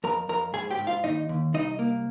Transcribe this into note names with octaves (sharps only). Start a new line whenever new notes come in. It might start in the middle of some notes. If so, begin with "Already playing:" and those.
F2 A#4 A#5
F2 A#4 A#5
G#2 G#4 G#5
G4 G5
G#2
F4 F5
D#2 D#4 D#5
D#2
C2 D#4 D#5
A#3